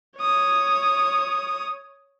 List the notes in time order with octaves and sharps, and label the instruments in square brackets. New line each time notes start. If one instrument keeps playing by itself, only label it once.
[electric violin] C#5 D#6